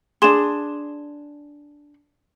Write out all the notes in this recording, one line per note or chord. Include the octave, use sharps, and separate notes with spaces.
D4 G#4 C6 E7